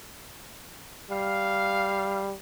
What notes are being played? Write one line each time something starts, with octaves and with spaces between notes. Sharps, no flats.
G3 F5